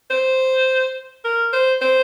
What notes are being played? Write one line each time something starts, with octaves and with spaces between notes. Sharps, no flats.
C5
A#4
C5
C5